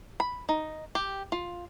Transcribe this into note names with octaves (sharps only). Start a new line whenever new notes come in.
B5
D#4
G4
F4